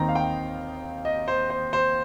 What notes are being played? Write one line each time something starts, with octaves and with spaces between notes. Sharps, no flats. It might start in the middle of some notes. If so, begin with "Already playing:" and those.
Already playing: D#2 D#3 C4 D#4 G5 A#5
F5
G5
D#5
C5
C5
C5